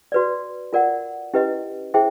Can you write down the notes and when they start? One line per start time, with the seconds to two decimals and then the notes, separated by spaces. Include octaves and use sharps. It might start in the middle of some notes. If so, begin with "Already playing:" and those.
0.12 F#4 B4 D5
0.73 F4 A#4 D5 F#5
1.34 C#4 E4 G4 B4 D#5
1.94 E4 G#4 C5 E5 G5